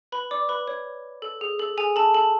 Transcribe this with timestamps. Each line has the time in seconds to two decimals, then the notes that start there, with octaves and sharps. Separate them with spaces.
0.12 B4 B5
0.31 D5 D6
0.49 B4 B5
0.67 C#5
1.22 A4
1.41 G#4
1.59 A4
1.77 G#4 G#5
1.96 A4 A5
2.14 A4 A5